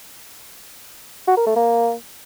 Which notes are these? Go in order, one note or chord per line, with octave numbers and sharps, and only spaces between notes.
F#4
A#4
A3
A#3